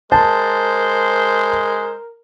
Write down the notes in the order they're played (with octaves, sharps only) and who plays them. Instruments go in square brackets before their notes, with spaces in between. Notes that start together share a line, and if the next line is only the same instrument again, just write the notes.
[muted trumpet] G#3 [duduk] A#4 [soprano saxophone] C5 [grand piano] A5